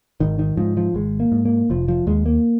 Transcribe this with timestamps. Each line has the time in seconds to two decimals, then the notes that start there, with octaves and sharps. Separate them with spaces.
0.20 G#1 D#3
0.39 D#3
0.57 G#2 F3
0.77 F3
0.94 G#1 G#3
1.20 A#3
1.32 G#2
1.45 A#3
1.70 F1 F3
1.88 F3
2.07 D#2 G#3
2.26 A#3